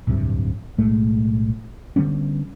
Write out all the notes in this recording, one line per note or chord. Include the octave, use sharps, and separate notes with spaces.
D1 C2 G2 C3
B1 A2 G#3 A3
D3 G3 B3 C#4